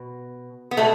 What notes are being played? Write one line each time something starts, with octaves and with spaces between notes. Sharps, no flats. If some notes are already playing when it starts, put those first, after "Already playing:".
Already playing: B2
B3
B2 G#3 A3